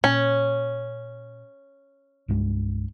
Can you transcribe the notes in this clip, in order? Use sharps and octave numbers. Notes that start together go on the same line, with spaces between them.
A#2 C#4
C2 G2 G#3